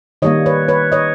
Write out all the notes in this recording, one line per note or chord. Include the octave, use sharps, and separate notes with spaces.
D#3 G3 A#3 C#5 D#5
B4 C#5
B4 C#5
C#5 D#5